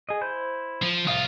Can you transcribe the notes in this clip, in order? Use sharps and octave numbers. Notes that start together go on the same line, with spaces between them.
G#4 D#5
E4 C5 G6
F3
C2 F4 E5 F5 D#6